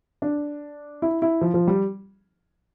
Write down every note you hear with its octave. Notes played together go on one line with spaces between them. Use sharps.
D4
E4
E4
F3
F3
G3